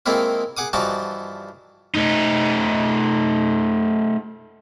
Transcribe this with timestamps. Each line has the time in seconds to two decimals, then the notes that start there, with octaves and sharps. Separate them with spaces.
0.06 D#3 G#3 A#3 C4 E4 F4
0.57 G#4 F#5 D6 D#6
0.73 G2 E3 F3 D#4 F#4 A5
1.95 A3 D#4